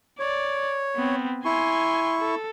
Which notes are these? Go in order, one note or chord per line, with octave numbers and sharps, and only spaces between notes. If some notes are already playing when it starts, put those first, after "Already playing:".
C#5 D5
B3 C4
E4 G#5 C6 C#6
A4